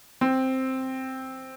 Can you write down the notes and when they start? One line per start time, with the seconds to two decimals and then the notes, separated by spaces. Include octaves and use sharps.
0.21 C4